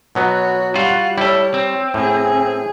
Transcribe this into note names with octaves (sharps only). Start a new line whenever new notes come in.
B2 F#3 B3 F#4 C#5
G3 F4 F#4 F#5
G3 E4 A4 C#5
C4
A2 G#4 G#5